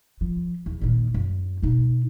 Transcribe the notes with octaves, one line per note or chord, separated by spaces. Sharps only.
F3
E2
A#2 D#3
F#2
B2 D#4